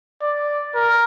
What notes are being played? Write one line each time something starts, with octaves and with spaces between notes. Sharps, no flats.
D5
A#4